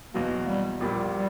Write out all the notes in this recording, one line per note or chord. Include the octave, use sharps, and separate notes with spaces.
E2 B2 F#3 A#3
G3
A#1 A#2 G3
G3